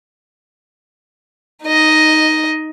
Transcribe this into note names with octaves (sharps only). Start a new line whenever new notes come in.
D#4 D#5